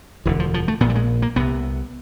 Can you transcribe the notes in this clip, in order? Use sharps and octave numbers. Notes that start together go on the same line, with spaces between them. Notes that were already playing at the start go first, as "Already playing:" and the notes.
E1 D2 D3 E3
F3
F3
A3
A#1 A#2 B3
G3
G#3
A#3
C2 C3 B3